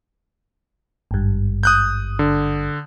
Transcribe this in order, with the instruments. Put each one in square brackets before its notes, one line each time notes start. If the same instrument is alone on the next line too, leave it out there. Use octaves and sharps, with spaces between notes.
[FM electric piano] G#1 G2
[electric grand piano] D#6 F#6 G6
D3